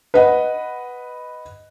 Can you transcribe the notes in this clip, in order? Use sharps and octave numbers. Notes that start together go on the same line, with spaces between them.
B4 D#5 F#5